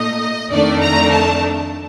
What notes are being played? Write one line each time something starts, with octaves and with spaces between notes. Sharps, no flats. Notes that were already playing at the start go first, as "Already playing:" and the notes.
Already playing: A#2 A3 D#4 D#5
F2 D#3 A3 D4 D5
A#5
A5